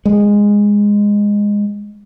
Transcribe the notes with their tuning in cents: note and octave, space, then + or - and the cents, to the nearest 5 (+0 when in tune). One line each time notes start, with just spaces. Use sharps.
G#3 -15